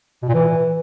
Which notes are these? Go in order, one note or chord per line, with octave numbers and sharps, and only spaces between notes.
B2
A#2
E3